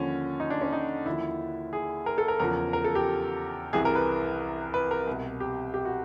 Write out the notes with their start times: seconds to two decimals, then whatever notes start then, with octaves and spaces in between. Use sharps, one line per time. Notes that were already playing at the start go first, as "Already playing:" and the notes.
Already playing: D#2 D3 F3 C#4
0.40 D#4
0.50 D4
0.61 C#4
0.73 D#4
1.06 D#2 D3 F3 E4
1.73 G#4
2.06 A#4
2.18 A4
2.28 A#4
2.40 E2 C#3 F3 A#4
2.73 A#4
2.84 A4
2.95 G4
3.73 C2 C3 E3 G#4
3.85 A#4
3.96 B4
4.74 B4
4.91 A#4
5.07 C2 B2
5.40 G4
5.74 G4
5.85 F#4